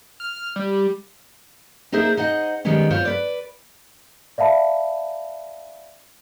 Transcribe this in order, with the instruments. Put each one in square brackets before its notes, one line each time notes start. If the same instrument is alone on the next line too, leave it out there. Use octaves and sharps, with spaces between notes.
[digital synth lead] F6
G3
[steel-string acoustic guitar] A#3 D#4 G#4 C5 E5
D#4 C5 D#5 F#5
D#3 G3 G#3 B3 C#4
B3 F4 C5 C#5
B4 D5
[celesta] D5 E5 F5 A5 B5